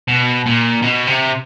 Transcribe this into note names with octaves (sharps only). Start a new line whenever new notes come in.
B2
A#2
B2
C3